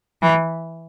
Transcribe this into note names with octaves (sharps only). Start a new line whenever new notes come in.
E3